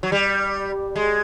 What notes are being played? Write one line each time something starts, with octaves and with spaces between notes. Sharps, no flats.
F#3
G3
G#3